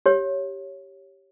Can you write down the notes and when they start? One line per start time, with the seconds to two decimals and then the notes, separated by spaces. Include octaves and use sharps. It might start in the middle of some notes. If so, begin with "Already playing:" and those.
0.06 G4 C#5